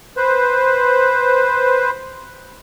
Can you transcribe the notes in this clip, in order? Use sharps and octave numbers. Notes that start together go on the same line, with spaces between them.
B4 C5